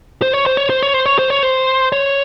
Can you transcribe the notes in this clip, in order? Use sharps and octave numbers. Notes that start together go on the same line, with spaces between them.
C5
C#5
C5
C#5
C5
C#5
C5
C#5
C5
C#5
C5
C#5